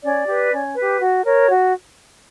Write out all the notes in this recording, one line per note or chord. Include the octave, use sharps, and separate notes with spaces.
C#4 D5
G4 B4
C#4
G4 B4
F#4
A#4 C#5
F#4